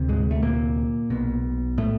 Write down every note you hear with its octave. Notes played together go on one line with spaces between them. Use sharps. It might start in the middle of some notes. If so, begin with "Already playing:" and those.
Already playing: D2 C3
G#2 G#3
A3
A#2 A#3
B1 B2
A2 A3